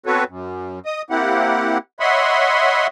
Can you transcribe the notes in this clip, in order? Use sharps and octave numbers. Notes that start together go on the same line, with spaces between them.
B3 C4 F#4 A4 B4 C#5
F#2
D#5 D#6
A#3 C4 E4 G4 F#5
C#5 D#5 E5 F#5 B5 C6